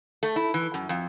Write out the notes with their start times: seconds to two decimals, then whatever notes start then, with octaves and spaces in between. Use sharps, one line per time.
0.23 A3
0.36 E4
0.54 E3
0.74 F#2
0.89 F2